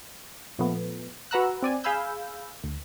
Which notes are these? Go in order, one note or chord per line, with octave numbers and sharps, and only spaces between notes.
A#2 F3 A3 B3
F#4 B4 F#5 A#5 E6 F#6
C4 D5 G#5
G#4 F5 G#5 B5 E6 G6
D2